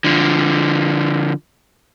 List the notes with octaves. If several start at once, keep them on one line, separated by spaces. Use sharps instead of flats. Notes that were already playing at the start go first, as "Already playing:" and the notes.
D3 F3